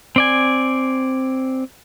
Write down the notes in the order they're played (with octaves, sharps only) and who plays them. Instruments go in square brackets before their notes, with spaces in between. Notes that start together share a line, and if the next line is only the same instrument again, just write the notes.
[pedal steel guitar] C4 D5 G#5